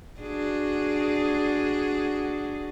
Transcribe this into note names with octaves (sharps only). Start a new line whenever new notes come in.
D4 F#4 G#4